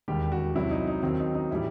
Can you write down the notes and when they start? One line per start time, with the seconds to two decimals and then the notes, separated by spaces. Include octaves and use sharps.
0.08 E1 D#2 D#3 G3 G4
0.32 F#4
0.55 C2 C3 F#3 E4
0.71 D#4
0.87 D#4
1.03 D#2 D#3 F#3 C4
1.19 D#4
1.34 D#4
1.51 A2 E3 G3 E4